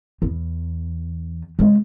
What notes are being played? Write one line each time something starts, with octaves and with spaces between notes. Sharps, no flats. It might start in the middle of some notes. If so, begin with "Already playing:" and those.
E2
C#3 G#3